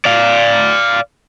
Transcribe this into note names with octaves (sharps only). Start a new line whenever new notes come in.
D5 F5